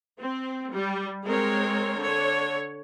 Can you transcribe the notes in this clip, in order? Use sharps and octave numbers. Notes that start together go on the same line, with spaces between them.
C4
G3
G#3 C4 A#4 C#5
D3 C#5